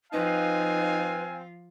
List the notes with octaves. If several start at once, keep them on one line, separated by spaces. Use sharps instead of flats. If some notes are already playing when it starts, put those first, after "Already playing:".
F3 C4 D#4 F4 B4 F5 G#5